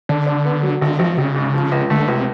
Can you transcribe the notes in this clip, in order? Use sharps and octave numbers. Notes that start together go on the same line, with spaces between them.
D3 D4
D4
B3
F#3
G#1 D3
G#1 F3
G#1 C#3
G#2
F3
C#2
D3 A3
C#2 C3